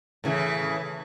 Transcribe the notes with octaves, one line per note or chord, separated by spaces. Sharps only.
A2 C#3 E3